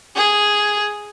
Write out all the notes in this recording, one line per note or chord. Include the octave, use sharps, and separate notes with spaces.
G#4